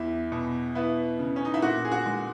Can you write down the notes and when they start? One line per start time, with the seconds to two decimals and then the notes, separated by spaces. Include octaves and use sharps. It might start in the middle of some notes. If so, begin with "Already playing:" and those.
Already playing: E2 E3 E4
0.32 B2
0.75 B3 E4
1.19 C#3
1.36 C#4
1.45 D#4
1.54 E4
1.62 A#2 F#4
1.85 G#4
1.92 F#4
2.06 G#3